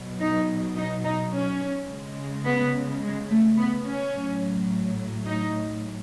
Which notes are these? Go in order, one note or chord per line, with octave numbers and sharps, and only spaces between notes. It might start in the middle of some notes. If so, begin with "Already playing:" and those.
Already playing: B2 F#3
D#4
D#4
D#4
C#4
C#3 G#3
B3
G#3
A3
B3
C#4
A2 F#3
D#4